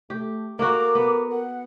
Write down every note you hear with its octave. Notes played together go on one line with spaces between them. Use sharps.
A3 G4
A#3 F#4 A4 A#4 D6
B3
F#5